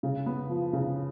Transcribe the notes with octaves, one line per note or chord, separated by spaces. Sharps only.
C#3
B3
F3
C#3